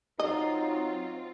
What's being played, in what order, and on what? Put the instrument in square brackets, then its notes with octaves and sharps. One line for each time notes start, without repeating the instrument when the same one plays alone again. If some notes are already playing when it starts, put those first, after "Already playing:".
[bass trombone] F#3 [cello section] C4 F4 [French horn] D#4 [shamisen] D#5